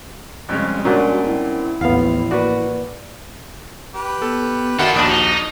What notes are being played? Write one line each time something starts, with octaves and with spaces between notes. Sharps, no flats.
F2 C#3 G3 G#3
A#2 C#4 D4 F#4 A#4 F#5
C4 E4
A1 D#2 F3 B3 F5
A#3 F#4 B4 D5
G4 B4
B3 A4
D#3 F4 F#4 A4 D5 E5 F#5 B5
A#1 D#2 D4 D#5
D#4